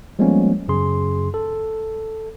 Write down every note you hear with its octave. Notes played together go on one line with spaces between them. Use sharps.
F3 G3 G#3 A#3 B3 C#4
F#2 C#3 G#4 C6
A4